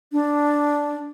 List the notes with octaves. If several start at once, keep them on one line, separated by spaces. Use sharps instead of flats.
D4